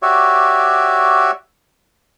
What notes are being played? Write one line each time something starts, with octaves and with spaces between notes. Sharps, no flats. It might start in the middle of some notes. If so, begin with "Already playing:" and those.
F#4 G4 C#5 D5 E5